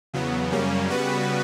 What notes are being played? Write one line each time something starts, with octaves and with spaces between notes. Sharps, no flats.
E2 C#3 F#3 B3
F#2 C#3 G3 A#3 C#4
C#3 G3 B3 F#4 B4